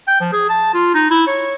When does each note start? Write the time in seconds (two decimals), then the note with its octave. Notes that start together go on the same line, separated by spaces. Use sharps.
0.08 G5
0.21 F3
0.33 G#4
0.49 A5
0.74 F4
0.94 D#4
1.10 E4
1.27 C#5